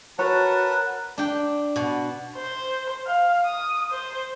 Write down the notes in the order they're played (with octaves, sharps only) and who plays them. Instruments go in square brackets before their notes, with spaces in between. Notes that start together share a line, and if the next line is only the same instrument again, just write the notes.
[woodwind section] F#4 A5 [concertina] A#4 F#5 [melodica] B4 [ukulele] C#5
[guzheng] D4 G5
B2
[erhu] C5
F5
D#6
C5